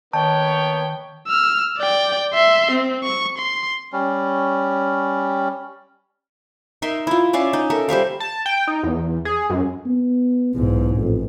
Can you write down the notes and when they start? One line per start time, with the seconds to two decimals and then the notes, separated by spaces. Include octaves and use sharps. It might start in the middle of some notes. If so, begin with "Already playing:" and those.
0.13 D#3 A#3 B3 C#5 G5 A5
1.27 E6 F6
1.78 D5 G5
2.34 E5 C6
2.71 C4
3.03 C#6
3.38 C6
3.93 G3 C#4
6.82 D#4 A#4 E5 C6
7.07 E4 F4
7.33 C#4 D5 E5 F5
7.53 D#4
7.70 A4 A#4 E5
7.89 G3 C5 E5 F5
8.20 A5
8.46 G5
8.67 D#4
8.83 E2
9.25 G#4
9.50 F#2
9.85 B3
10.55 B1 E2 G#2
10.97 A1 F2